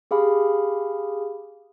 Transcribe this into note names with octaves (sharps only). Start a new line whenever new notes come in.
G4 G#4 F5 B5